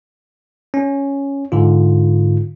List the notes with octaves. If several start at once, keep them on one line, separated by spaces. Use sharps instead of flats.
C#4
G#2 D3 F4